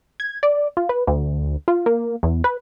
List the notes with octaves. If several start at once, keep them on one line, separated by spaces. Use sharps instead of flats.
G#6
D5
F4
B4
D2
F4
A#3
E2
B4